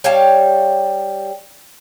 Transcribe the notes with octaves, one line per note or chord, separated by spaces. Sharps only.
G3 C#5 F5 A5